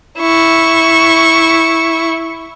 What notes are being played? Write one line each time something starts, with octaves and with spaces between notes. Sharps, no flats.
E4 C#6